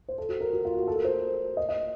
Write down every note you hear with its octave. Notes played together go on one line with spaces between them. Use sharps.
C5
A4
F#4
A#4
F#4
F4
F#4
A4
A#4
C5
D#5
D#5